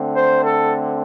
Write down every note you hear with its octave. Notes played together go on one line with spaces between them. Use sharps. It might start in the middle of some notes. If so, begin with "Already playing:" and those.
Already playing: D3 A3 C4
C5
A4